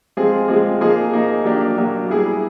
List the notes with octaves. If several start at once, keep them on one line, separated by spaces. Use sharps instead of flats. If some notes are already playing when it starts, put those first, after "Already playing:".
F3 G#3 C4 F4 G#4
F3 G#3 C4 F4 G#4
F3 A#3 D#4 G#4
F3 A#3 D#4 G#4
F#3 A#3 D4 G4
F#3 A#3 D4 G4
G3 B3 E4 G#4